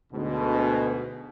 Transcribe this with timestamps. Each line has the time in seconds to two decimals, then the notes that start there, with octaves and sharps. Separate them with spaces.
0.12 D2 G#2 B2